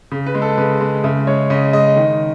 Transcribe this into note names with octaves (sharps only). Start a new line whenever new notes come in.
C#3
B4
G#3
A4
C#3 B4
G#3
C#3 E5
G#3 C#5
C#3 D#5
G#3 D#5
D#3